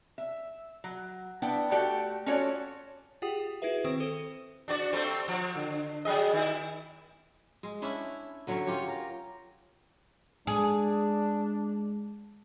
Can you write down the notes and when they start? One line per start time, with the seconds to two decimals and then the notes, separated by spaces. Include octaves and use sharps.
0.18 E5
0.84 F#3
1.42 B3 D4 E4 G5
1.71 A3 F#4 G4 A4 D5 G5
2.26 C#4 F4 F#4 A4 C#5 D5
3.22 F4 G4 G#4 F#5 G5 D#6
3.62 E4 F#4 G#4 B4 E5
3.85 D#3 C4 C5 D#6 D7
4.00 A4 C5 D#6 D#7
4.68 D4 F#4 D5
4.93 G3 A3 C4
5.28 F3
5.56 D3
6.05 F#3 G#4 D#5
6.33 D#3 E4
7.63 G#3
7.82 C#4 D4 E4 E5
8.47 D3 F#3 C#4 C#5
8.66 C#4 F4 G4 C#5
8.87 A#4
10.47 G#3 D4 G#4